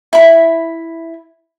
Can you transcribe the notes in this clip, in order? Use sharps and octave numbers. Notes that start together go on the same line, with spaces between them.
E4 B5